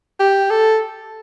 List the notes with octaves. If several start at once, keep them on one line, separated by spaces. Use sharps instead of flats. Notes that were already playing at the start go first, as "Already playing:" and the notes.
G4
A4